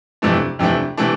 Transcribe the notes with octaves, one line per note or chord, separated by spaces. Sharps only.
F2 C3 E3 A3 D4
F2 C3 E3 A3 D4
C3 E3 A3 D4